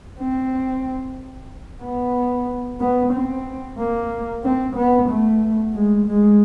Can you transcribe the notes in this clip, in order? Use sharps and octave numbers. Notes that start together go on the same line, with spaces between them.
C4
B3
B3
C4
A#3
C4
B3
A3
G#3
G#3